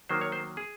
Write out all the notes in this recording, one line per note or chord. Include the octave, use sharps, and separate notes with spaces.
D#3 F#3 A#3 C5
C#5
C5
G#4